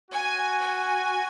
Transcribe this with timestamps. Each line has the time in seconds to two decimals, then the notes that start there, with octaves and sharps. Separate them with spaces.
0.11 F#4 G#5
0.59 G#5